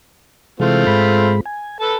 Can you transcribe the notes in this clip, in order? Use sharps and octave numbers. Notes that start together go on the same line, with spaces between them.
C3 E3 G#3 A3 C4 F4
G#2 G#3 B5
G#5
A4 B4 A5